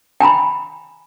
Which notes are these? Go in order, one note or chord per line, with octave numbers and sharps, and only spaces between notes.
G5 G#5 A#5 B5